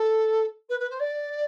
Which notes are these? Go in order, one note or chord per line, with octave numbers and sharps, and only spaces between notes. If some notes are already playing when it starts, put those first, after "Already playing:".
Already playing: A4
B4
B4
C5
D5